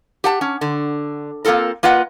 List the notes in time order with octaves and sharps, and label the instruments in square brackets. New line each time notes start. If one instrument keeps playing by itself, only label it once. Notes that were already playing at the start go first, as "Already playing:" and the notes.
[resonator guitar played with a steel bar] G4 F#5 A5
C#4
D3
A#3 C4 F4 A4 A#4
A#3 F4 B4 D#5 F#5